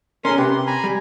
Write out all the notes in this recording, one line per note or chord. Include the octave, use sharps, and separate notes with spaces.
C#4 G#4 A#4 C6
C3 G4 B4
C6
G#5 A#5 B5
G3